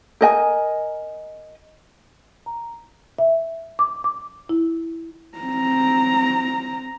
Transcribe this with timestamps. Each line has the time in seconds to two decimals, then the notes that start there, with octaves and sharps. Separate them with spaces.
0.21 A#4 D#5 G#5
2.46 A#5
3.19 E5
3.79 D6
4.04 D6
4.49 E4
5.38 C4 A#5